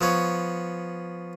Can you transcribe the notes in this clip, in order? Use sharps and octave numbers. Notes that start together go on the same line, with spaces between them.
F3 B3 C#5